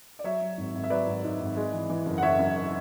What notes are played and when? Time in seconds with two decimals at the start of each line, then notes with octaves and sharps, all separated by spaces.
0.19 D5
0.24 F#3 C#5 E5
0.41 F#3
0.57 G#1
0.74 G#1
0.84 E5
0.90 F#3 B4 D5
1.07 G#1
1.24 G#2
1.40 G#1
1.56 G#3
1.73 E3
1.90 E3
2.06 F#1
2.18 F#5
2.22 F#1 C#5 E5
2.39 F#2